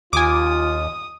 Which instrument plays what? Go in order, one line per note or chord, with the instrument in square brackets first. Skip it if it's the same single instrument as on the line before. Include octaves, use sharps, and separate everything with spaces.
[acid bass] D#2 [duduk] F4 [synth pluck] G#5 D6 [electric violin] D#6